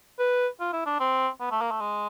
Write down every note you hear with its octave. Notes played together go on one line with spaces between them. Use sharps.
B4
F4
E4
D4
C4
B3
A3
A#3
A3
G#3